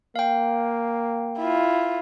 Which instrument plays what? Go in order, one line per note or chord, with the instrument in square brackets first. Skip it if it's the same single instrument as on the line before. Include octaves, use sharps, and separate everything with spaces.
[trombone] A#3 [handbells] F5 G5
[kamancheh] E4 F4